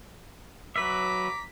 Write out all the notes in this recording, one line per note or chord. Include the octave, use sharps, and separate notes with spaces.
F#3 B4 E5 A#5 D6 B6